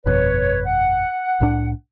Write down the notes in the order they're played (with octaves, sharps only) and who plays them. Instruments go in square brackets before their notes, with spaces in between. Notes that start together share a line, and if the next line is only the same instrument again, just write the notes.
[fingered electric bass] G1 F2 B2 [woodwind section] B4 C#5
[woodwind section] F#5
[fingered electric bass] C2 A2 D4